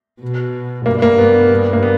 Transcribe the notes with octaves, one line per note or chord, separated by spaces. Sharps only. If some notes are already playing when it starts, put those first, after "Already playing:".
B2
G2 A#3
A#3
G2 B3
G2
A#3
B3